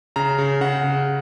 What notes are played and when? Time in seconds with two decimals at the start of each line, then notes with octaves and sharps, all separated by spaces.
0.16 C#3 A#5
0.38 C#3
0.61 C#3 F#5
0.84 C#3